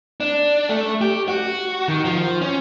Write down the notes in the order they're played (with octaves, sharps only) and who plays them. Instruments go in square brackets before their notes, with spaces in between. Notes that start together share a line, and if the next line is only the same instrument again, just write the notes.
[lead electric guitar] D4
A3
G4
F#4
D#3
F3
C#4